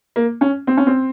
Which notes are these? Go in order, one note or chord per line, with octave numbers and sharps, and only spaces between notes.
A#3
C#4
C4
C#4
C4